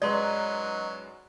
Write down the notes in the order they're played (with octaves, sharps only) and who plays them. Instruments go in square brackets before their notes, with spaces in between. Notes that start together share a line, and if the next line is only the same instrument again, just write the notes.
[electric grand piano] F#2 G#3 B4 [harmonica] F#3 [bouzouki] D#4 [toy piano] D5 C6